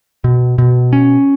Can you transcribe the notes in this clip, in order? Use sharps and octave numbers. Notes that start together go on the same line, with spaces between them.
B2
B2
C#4